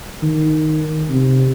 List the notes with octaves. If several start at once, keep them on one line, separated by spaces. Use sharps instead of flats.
D#3
C3